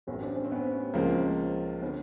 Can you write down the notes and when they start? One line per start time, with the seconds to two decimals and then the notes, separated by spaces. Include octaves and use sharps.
0.07 A1 A2 F#3 B3 C#4
0.21 C4 D4
0.36 C#4
0.44 C4
0.52 B3 C#4
0.94 C#2 C#3 F3 A#3 C4
1.82 B3 C#4
1.85 D3